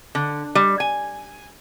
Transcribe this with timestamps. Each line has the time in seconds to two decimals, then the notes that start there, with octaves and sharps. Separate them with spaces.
0.15 D3
0.55 G3
0.80 G#5